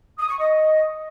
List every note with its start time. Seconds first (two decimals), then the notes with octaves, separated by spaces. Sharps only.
0.18 D#6
0.29 C#6
0.39 D#5